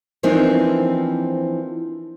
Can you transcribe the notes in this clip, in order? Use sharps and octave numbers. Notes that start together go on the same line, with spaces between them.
E3 F3 A#3 C4 D4 D#4